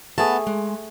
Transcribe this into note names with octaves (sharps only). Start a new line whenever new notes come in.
A3 B3 G#4 A5
G#3